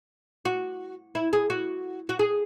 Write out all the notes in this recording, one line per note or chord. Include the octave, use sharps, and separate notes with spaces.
F#4
E4
G#4
F#4
F#4
G#4